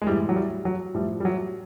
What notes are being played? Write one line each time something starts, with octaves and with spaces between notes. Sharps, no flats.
G#3
A2 E3 G3
F#3
G3
F#3
A2 F3 G3
G3
F#3